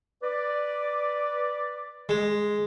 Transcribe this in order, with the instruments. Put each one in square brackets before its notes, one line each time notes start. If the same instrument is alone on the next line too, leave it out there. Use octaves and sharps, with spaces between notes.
[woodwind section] B4 D5
[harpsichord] G#3